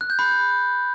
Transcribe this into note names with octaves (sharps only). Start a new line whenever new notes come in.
F#6
G6
B5